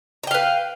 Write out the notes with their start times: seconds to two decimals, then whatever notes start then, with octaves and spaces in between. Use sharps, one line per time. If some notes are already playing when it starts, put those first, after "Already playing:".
0.24 A#5
0.27 G5
0.31 F5
0.34 B4